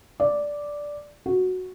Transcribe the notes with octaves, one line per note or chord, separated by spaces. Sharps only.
D5
F#4